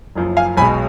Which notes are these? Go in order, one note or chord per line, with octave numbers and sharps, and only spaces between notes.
F#1 F#2 F3
F5 G#5
B1 B2 G#3 G#5 B5